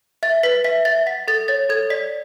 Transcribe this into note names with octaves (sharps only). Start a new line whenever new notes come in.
E5 A6
B4 B6
E5 B6
E5 A6
F#5 B6
A4 A6
C#5 A6
A4 G#6
D5 B6